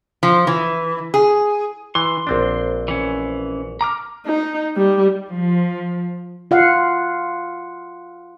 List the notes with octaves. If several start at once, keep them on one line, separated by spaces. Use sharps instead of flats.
F3
E3
G#4
E3 C6
A#1 C4 D4
E3 C#4
A#5 D6 F6
D#4
G3
F3
F4 F5 F#5